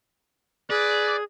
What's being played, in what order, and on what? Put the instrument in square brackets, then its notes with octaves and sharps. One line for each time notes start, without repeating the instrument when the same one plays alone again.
[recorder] G#4 [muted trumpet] B4 [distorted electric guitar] D5